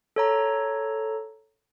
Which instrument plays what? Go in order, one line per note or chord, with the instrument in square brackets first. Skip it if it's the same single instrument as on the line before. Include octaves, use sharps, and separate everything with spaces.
[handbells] A4 C#5 A#5